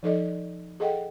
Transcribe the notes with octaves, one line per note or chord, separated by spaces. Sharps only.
F3 D#4 A4 D5 D#5
G#4 A4 D#5 F#5 G5